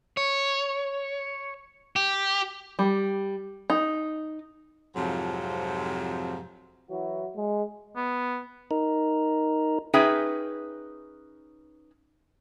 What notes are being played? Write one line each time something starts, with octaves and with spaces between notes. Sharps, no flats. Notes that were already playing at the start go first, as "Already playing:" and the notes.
C#5
G4
G3
D#4
F2 G#2 C3 F3 F#3
E3 F#3 E4 F#4
G#3
B3
D#4 A#4
C#4 D#4 G#4 B4 E5 G5